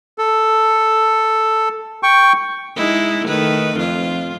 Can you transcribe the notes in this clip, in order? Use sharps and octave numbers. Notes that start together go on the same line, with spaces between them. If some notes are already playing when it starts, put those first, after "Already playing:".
A4
G5 C#6
G#3 D#4 E4
D#3 A3 B4
F2 F4